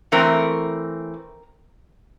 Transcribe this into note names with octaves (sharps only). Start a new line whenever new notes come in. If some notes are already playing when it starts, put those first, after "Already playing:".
E3 A3 C4 A#4